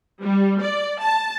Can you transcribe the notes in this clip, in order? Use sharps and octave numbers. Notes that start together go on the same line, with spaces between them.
G3
D5
A5